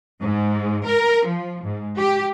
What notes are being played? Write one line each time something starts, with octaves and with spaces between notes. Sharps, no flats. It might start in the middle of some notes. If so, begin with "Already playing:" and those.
G#2
A#4
F3
G#2
G4